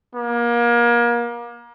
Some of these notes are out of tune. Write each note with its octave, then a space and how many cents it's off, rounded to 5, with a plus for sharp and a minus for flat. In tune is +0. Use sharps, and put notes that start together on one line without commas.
A#3 +30